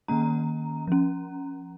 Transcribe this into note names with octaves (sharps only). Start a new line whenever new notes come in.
D#3 A#3 C#4 A#5
F3 C#4